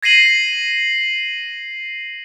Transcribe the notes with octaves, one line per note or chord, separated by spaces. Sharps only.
G#6 A#6 C7 D#7 F#7